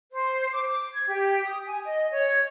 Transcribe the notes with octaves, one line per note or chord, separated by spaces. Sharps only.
C5
D6
G#6
G4
D#6
G#5
D#5
C#5